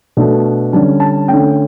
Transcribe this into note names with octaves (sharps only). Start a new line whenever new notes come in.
B2 A3 D4
D3 G3 C#4 A5
A5
D3 A3 C#4 G5